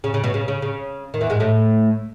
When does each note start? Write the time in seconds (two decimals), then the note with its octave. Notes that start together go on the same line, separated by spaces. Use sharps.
0.04 C#3
0.14 C#3
0.24 B2
0.34 C#3
0.48 C#3
0.62 C#3
1.14 D#3
1.21 E2 E3
1.30 G#2 G#3
1.40 A2 A3